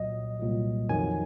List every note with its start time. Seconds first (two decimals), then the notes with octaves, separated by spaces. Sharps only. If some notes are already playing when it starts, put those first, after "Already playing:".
Already playing: C2 A#2 F#3 D#5
0.39 C2 A#2 F#3
0.89 F2 D#3 F#3 G#5